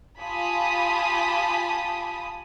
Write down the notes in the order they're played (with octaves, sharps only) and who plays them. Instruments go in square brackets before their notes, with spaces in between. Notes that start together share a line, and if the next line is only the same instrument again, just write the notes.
[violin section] F4 G4 G#5 A5 B5 D#6